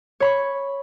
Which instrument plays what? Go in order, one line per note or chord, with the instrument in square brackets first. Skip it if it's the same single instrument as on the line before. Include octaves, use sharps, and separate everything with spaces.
[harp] C#5 B5 C#6